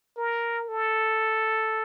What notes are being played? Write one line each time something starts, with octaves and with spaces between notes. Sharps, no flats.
A#4
A4